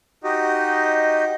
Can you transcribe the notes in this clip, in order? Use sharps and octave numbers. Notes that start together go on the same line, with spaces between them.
D#4 F#4 G4 D#5